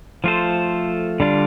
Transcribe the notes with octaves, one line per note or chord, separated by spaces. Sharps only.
F3 A3 F4 A4 C5
D3 G3 D4 F4